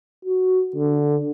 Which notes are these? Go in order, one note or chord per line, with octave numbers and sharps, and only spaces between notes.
F#4
D3